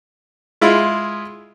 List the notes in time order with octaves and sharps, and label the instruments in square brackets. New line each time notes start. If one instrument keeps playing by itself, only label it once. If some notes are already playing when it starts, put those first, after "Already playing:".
[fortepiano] G#3 E4 F4 G#4